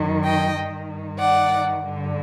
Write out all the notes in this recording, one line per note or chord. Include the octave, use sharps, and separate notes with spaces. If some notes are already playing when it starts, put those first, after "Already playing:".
Already playing: F#2 D#3
D#5 G5
G2 D#3
D5 F#5
G2 D3